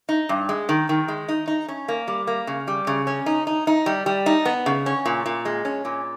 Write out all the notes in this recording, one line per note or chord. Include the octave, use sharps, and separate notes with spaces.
D#4
G2
G#3
D#3
D#3
G#3
D#4
D#4
C#4
A#3
G3
A#3
C#3
G3
C#3
C#4
D#4
D#4
D#4
G3
G3
D#4
B3
C#3
C#4
A#2
A#2
G#3
C#4
A#2